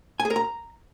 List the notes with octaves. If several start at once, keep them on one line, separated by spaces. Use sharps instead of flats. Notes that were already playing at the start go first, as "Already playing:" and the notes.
G#5
G#4
A#4
A#5